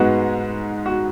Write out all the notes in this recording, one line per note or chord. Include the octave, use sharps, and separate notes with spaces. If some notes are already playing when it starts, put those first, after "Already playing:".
Already playing: G#2 G#3 B3 F#4
F#4